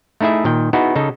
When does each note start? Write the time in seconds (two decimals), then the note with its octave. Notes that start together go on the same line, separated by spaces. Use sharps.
0.21 A3 D#4 E4 G#4 E5
0.44 A#2 D#3 G5
0.73 B3 D#4 E4 F#4 G#4
0.96 C#3 D#4 A4